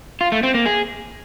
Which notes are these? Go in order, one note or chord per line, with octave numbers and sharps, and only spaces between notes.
F4
A3
C4
A#3
G#4